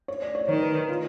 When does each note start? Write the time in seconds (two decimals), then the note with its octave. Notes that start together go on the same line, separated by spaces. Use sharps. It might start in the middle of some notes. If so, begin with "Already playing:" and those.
0.08 C#5
0.22 D5
0.35 C#5
0.48 D#3 C#5
0.62 B4
0.89 F4